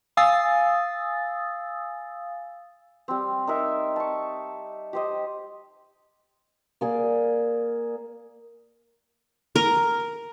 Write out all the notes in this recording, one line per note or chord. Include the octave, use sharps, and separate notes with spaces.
F5 G#5 D#6 E6 A6
G3 C4
D#4 A#4 E5
A5 C#6
G4 C5 D#5
A#3 G#4 D5
A#4